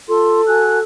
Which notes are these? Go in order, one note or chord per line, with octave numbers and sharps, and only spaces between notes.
F4 A4 C6
F#4 G#5 F#6